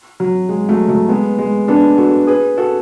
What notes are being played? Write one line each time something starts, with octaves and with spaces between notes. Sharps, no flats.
F#3
G#3
F#3 A3
F#3 A3
G#3 B3
G#3
B3 D4
F#4 A4
G#4 B4
F#4 A4